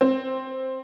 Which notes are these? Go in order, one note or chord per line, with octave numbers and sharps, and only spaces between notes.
C4